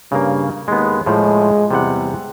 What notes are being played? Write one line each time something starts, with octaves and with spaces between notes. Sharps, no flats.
G2 C#3 A#3
D#2 G#3 B3
A2 F3 G#3
E2 C3 G3 F#5